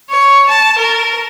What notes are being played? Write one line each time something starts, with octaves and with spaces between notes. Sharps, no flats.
C#5
A5
A#4